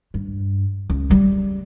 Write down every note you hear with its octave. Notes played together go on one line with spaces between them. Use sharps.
G2
C#2
C#3 G3